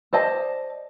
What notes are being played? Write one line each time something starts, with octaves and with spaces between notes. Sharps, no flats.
C5 D5 D#5 A5